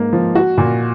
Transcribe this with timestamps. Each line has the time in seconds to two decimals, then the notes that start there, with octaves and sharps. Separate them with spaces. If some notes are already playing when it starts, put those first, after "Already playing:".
Already playing: G#2 A#3
0.13 F3
0.35 F#4
0.58 A#2